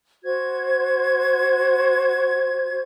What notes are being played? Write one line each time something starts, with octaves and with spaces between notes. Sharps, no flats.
F#4 C5 G#6